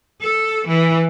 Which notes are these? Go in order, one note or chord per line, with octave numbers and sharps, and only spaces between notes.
A4
E3